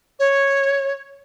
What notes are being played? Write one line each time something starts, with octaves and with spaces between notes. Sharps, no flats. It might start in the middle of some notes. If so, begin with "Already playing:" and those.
C#5